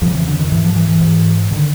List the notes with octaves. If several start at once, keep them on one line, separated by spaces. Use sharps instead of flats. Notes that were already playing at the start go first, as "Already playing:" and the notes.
F2 C#3 F3
E3
D3
D#3
G#2 E3
F3
E3
E3
G#2
D3 D#3